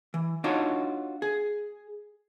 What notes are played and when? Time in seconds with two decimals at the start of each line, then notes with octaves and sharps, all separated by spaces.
0.14 E3
0.44 D4 D#4 F4 F#4 C#5
1.22 G#4